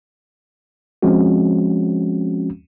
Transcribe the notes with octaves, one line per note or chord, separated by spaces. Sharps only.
F3 G#3 C4 C#4 F#4